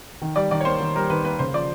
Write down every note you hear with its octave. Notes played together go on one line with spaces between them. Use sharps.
D#3
G3 D5
D#3 D5
C#5
A#3 C5
D#3
G3 A#4
D#3 B4
A#3 B4
C#3 C5
F3 D5